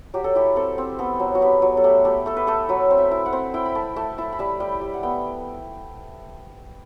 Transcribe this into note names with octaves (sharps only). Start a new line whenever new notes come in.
F#3 G4
A4
E4 G4
C4 A4
C4
B3 A4
F#3
F#4
B3 G4
F#3
A4
A3 G4
A3 G4
A3 A4
B4
A3 A4
F#3 B4
C4
E5
E4
F#5
C4
E4 G5
B5
A3 A5
A3 A5
E4 A5
B5
G3 A5
G3 G5
G3
F#5
B3 G5